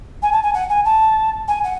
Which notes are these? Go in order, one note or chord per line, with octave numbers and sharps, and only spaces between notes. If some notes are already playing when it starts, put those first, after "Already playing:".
G#5
A5
G#5
F#5
G#5
A5
G#5
F#5